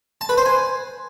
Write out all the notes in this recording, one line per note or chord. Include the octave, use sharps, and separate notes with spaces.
A5
B4
C5
G#5